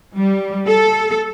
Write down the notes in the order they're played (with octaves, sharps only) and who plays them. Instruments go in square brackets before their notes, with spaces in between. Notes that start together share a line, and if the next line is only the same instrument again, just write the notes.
[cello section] G3
A4